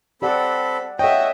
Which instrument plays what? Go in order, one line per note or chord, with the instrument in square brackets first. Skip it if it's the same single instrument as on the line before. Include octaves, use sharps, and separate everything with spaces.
[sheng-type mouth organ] C4 A4 B5 [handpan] G4 D5 F#5
[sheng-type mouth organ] F#4 [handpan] A4 C#5 [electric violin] D#5 E5 [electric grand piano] G5